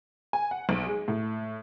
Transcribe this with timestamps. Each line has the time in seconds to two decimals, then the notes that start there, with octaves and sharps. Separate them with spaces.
0.33 G#5
0.51 F#5
0.69 B1
0.86 G#3
1.08 A2